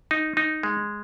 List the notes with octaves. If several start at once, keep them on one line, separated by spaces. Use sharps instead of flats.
D#4
D#4
G#3